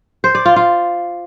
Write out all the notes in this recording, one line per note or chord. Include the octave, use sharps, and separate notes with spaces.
C5
D5
F4
F4